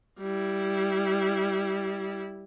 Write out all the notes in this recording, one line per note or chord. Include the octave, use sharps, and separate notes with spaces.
G3 E4